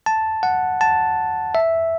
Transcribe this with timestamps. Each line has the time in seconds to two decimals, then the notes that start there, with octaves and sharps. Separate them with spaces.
0.06 A5
0.43 F#5
0.81 A5
1.55 E5